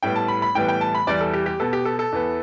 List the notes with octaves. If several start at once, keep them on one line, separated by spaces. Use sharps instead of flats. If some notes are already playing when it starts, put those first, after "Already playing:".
A2 G3 B3 G5
A5
B5
B5
A2 E3 G3 B3 G5
G5
A5
B5
E2 E3 G3 D5
A4
G4
G4
B2 B3 A4
G4
A4
A4
E2 E3 B3